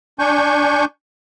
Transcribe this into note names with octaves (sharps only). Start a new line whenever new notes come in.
D4 G#5 C#6 G6